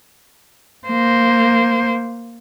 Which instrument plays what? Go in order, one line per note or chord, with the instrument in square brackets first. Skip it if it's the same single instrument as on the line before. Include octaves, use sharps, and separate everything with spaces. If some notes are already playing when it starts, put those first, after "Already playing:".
[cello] A#3 C5